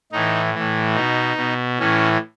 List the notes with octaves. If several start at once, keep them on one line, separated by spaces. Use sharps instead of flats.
A2 E3 D#4
A2 E3
B2 D#4
B2
A2 E3 C#4